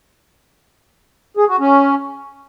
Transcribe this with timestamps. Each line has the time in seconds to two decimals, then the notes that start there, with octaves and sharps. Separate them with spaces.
1.37 G#4
1.48 F#4
1.60 C#4